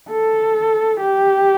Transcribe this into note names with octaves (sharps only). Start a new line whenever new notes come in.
A4
G4